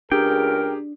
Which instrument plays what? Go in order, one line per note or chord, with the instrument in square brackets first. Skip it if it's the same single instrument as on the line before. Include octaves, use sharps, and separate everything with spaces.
[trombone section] C#2 A#4 [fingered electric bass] D4 [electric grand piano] G4 G#4 [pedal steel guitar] G5